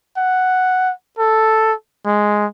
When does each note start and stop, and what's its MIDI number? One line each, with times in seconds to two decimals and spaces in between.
0.17 0.92 78
1.19 1.73 69
2.06 2.46 56